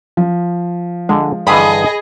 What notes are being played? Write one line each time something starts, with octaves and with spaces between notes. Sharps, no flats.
F3
D3 G#3 G#5
G2 D3 E3 G#4 D#5 B5 D#6